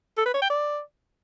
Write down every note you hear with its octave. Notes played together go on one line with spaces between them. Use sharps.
A4
B4
C#5
G5
D5